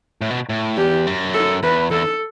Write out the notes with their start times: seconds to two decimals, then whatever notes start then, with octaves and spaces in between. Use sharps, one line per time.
0.21 A2
0.30 B2
0.49 A2
0.78 E2 G4
1.07 F#2
1.34 A4
1.63 E2 B4
1.91 E2 A4